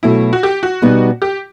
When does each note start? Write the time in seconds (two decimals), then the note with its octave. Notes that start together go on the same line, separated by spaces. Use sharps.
0.03 B2 F#3 A3 E4
0.33 F#4
0.43 G4
0.63 F#4
0.82 B2 G3 B3 D#4
1.22 G4